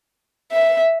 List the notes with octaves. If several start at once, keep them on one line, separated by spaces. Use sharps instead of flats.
E5